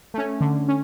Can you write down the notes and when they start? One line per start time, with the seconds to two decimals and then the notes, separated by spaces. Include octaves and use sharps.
0.14 A3 C#4
0.41 D3
0.68 C#4